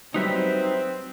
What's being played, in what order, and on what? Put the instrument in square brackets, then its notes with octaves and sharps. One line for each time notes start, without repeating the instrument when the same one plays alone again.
[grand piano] F#3 G3 [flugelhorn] C4 [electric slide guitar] D#4 B4 E5